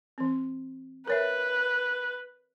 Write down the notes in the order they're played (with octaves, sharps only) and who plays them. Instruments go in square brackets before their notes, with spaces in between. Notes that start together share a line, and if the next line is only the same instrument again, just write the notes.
[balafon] E3 C4
[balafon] A#4 C#5 E5 [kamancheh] B4